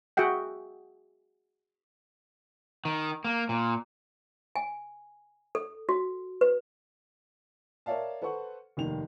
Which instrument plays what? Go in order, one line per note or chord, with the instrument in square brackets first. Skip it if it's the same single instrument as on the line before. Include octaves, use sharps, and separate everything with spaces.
[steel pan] F#4 G#4 E5 F#5 G5
[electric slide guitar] D#3
A#3
A#2
[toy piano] G#5
A4
F#4
B4
[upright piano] A#4 C#5 D5 E5 F5 A5
A4 B4 C5 F#5 C#6
F1 D#2 D#3 F7